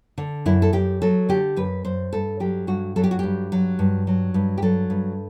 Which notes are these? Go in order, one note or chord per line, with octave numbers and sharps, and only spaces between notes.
D3
F#2 E4
A4
F#2 G4
F#3 A4
D3 G4
F#2 B4
F#2 C5
G2 A4
F#3 G4
G2 F#4
F#3 A4
G4
F#4
G2 G4
F#3
G2
F#3
G2
G4
F#3 A4
G2